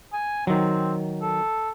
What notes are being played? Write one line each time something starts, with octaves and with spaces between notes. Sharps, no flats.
G#5
D#3 F#3 C4
A4